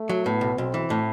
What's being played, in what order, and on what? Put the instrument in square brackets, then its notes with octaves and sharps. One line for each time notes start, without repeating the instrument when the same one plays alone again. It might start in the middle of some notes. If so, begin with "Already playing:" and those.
Already playing: [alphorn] A3
[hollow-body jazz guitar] F#3
[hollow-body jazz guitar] A2 [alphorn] B3
[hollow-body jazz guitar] B1
[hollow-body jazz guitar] B1 [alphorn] C4
[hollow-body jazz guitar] E3
A2